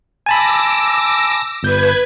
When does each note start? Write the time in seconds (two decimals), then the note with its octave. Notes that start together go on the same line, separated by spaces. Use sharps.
0.26 G#5 A5 B5 D6 E6 A#6
1.63 G1 B4 G6 G#6